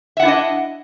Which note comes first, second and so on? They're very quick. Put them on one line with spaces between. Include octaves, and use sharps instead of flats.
E5 F#5 E4 D4 D#5